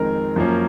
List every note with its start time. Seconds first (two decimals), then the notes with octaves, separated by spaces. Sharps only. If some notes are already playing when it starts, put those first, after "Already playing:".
Already playing: F2 D#3 G#3 C4 A#4
0.36 F#2 F3 A#3 C#4